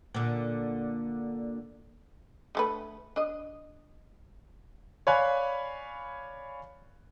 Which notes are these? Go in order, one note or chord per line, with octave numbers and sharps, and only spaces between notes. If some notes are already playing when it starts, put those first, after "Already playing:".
A#2 D3
D3 A3 B4
D4 D#5
C#5 D5 F5 G#5 B5 F#6